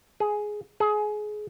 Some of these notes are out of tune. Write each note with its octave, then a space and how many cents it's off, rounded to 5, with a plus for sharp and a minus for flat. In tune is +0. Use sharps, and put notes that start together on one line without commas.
G#4 +10
G#4 +25